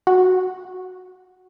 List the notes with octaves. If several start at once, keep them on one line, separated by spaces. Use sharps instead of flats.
F#4